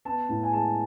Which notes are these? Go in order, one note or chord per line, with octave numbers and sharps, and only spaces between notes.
B3 A5
A2
G#5
G#3 A5